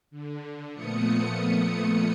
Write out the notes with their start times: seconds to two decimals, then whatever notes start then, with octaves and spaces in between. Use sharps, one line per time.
0.11 D3
0.75 A#2 F3 A3 B3 D#6 C#7